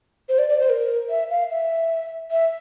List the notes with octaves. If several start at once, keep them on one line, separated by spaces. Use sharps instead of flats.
C5
D5
D5
C5
A#4
E5
F5
E5
E5